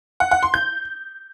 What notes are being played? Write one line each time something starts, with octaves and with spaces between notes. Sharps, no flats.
F#5
F#5
C6
G6